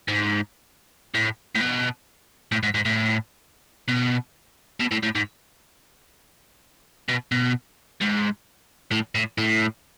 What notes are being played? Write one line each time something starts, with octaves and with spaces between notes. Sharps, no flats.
G#2
A2
A2
B2
A2
G#2
G#2
A2
B2
B2
A2
A2
G#2
B2
B2
G#2
A2
A2
A2